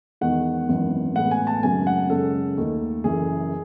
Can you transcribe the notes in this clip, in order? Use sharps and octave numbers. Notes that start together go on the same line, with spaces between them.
E1 E2 D#3 F#5
G#1 F#2 E3 B3
A1 A2 G#3 B3 F#5
G#5
A5
G#1 F#2 C#3 F#3 A3 G#5
F#5
F#2 C#3 G#3 C#4 A4
D#2 D#3 A3
F#1 F#2 E3 G#4